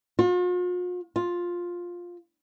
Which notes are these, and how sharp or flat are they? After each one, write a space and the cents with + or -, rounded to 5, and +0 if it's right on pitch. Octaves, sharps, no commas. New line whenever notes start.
F4 +45
F4 +10